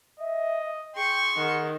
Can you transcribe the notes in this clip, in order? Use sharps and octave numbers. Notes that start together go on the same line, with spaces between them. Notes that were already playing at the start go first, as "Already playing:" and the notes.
D#5 E5
G#4 G5 C6 C#6
D#3 F#5